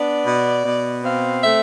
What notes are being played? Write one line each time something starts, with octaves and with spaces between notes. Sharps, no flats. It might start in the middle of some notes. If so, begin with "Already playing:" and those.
Already playing: B3 D4 D5
B2
B2
C4 F5
A3 E5